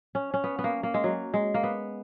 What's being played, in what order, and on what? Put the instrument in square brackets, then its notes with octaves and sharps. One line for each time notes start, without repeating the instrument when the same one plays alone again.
[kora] C#4
C#4
B3
B3
A#3
A#3
G#3
F#3
G#3
A#3
B3